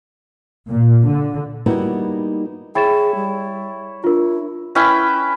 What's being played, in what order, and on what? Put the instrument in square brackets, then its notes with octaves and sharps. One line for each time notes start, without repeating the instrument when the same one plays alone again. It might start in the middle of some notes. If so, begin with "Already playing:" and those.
[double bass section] A#2
D3
[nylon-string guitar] G3 A#3 B3 D#4 E4 F#4
[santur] E4 C#5 [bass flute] G#4 [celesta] G5 A6 E7
[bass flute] G3
[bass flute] D4 [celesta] F4 A#4
[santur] C#4 E4 B4 G5